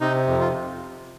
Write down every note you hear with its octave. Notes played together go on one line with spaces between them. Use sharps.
C3 D#4
F2
F4